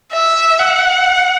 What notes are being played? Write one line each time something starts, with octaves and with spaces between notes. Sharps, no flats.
E5
F#5